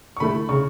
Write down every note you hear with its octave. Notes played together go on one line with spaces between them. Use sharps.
C#6
D3 A3 E4 B5
C#3 C#6